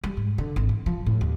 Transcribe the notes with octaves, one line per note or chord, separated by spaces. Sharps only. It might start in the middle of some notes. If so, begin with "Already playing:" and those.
G3
G#2
D3
G#1
E3
F3
A2
D#2